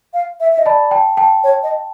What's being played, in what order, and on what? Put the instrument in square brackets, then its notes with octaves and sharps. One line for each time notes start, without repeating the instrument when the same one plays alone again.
[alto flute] F5
E5
E5
D#5
[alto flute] D5 [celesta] A5 B5
[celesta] G5 A5
G5 A5
[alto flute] C#5
D#5